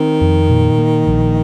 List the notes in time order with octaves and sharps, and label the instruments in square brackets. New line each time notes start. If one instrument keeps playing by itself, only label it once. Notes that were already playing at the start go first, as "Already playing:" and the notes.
Already playing: [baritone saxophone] D#3 [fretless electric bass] C4
[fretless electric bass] F2
A#2
A#3
A#1